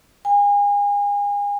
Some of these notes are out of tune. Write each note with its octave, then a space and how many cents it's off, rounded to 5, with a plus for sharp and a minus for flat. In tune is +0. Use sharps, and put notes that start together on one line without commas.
G#5 -35